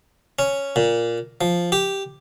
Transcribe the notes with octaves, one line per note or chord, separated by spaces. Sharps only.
C#4
A#2
F3
G4